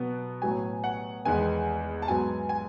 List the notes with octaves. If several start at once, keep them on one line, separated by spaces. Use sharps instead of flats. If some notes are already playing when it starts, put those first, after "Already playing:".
Already playing: B2 F#3 B3
A2 F#3 B3 G#5
F#5
E2 D#3 G#3 B3 G#5
A5
G#2 F#3 B3 G#5
G#5